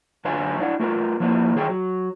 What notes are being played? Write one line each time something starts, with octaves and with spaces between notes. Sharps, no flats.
F#2 D3 B4 C#5 F5 G#5
D4 E4 F#5
A3 F4 A#4 B4
F3 A#3 E4 B4
D#3 G#4 C#5 G5
F#3